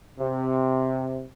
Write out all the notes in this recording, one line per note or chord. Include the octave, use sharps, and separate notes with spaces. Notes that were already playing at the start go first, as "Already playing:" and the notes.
C3